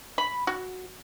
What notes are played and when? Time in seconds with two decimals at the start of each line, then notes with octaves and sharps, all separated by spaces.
0.18 B5
0.47 F#4